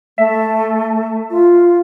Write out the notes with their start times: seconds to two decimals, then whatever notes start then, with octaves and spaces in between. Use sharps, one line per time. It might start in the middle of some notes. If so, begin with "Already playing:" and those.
0.18 A3 E5
1.31 F4